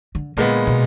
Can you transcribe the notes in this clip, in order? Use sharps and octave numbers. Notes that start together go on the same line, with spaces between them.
D3
A#2 D3 G#3 B3
B2